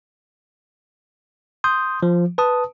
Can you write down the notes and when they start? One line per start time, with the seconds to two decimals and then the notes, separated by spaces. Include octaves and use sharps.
1.64 C6 D#6 G6
2.03 F3
2.38 B4 A5 D#6